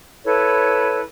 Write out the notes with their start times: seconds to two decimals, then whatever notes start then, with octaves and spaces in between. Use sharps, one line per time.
0.24 E4 A4 B4 C#5